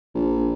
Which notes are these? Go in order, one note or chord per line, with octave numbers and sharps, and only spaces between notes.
A#1